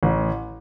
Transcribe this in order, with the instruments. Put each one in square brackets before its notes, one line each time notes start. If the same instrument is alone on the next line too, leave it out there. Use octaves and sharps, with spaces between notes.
[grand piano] A1